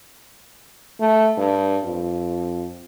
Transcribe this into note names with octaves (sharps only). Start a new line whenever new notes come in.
A3
G2
F2